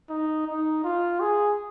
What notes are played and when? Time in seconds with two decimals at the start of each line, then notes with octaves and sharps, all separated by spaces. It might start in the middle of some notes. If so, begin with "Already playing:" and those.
0.09 D#4
0.47 D#4
0.84 F4
1.20 G#4